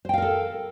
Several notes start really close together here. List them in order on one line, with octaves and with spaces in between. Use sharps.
C5 G5 F5 A#4 A4